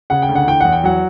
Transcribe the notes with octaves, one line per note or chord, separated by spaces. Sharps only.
C#3 F#5
G5
D2
F#5
E3 G5
E2 F#5
G5
F#3 F#5